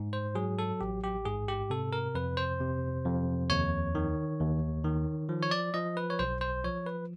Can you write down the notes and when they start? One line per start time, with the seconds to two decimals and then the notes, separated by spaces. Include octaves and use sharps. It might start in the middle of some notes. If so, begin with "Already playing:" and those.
Already playing: G#2
0.13 C5
0.35 F#3 G#4
0.59 A4
0.81 A1 G4
1.04 G4
1.25 G#2 G#4
1.48 G4
1.70 C3 A4
1.93 A#4
2.15 F2 B4
2.37 C5
2.60 C3
3.05 F2
3.50 D#2 C#5
3.95 D#3
4.40 D#2
4.84 D#3
5.29 F3
5.43 C#5
5.51 D5
5.74 F3 D#5
5.97 B4
6.10 C#5
6.19 B1 C5
6.41 C5
6.64 F3 C#5
6.86 B4